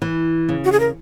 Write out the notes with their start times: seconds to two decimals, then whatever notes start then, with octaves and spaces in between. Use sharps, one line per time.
0.02 E3
0.49 C#3
0.65 F#4
0.72 G#4
0.80 A#4